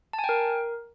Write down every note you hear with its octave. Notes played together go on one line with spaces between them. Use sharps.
A5
G#5
G5
A#4